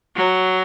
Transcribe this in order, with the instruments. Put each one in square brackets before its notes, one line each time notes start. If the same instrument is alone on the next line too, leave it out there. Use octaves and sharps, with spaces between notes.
[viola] F#3